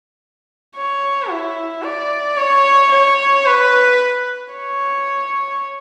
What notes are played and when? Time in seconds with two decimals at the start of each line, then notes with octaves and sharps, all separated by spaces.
0.76 C#5
1.30 E4
1.83 D5
2.37 C#5
2.91 C#5
3.46 B4
4.54 C#5